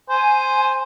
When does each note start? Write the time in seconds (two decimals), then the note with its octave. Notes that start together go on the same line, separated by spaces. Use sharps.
0.09 C5 G#5